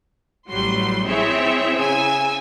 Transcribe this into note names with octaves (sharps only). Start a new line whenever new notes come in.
A1 F#3 G3 C6
C4 E4 G#4 C#5 E5
C#3 G#5 E6